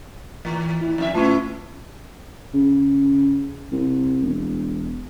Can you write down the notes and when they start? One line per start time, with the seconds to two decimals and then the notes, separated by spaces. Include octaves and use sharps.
0.45 A2 E3
0.81 E4
0.98 F2 F4 E5
1.14 A#2 A3 C#4 E4 F4
2.54 C#3
3.72 C2
4.24 E1